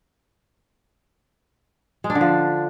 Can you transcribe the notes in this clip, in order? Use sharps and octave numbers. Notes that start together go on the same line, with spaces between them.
G#3
D4
D3
F3